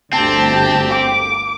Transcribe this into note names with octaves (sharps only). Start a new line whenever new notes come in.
G1 D2 C4 G4 A5
D6